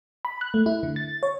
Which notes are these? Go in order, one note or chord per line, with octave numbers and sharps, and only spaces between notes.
B5
F#6
A3
E4
D3
A6
C#5